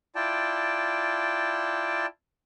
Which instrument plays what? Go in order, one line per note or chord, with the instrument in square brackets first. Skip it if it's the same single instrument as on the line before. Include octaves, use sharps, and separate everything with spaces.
[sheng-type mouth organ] E4 F4 D5 G5 A5